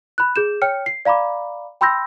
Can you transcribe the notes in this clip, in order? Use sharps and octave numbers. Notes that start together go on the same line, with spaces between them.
B5 F#6
G#4 G6 E7
C#5 G5 F6 C#7
C7
D5 F5 A#5 B5 D6
G5 B5 C6 E6 G6 A#6